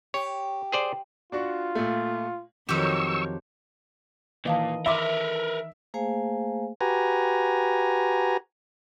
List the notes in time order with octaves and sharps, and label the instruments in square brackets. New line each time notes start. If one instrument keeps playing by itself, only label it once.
[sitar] G4 [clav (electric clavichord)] C#5
[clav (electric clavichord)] G#4 C5 D5
[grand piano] D4 F#4 C#6 [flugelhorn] F4
[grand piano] A#2 A3
[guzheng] F2 G4 [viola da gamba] D#3 F#3 C#5 [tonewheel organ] C#6 E6
[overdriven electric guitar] A#2 [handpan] D#3 E3 D#5 [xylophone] B4 F5 A5
[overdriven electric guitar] A#4 B4 [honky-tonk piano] E5 [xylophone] B5 C6 D6
[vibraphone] A3 A#3 G#4 C5 F5 G#5
[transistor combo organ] F#4 G4 B4 G#5 A#5